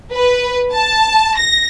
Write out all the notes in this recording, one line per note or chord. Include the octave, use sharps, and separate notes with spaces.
B4
A5
A#6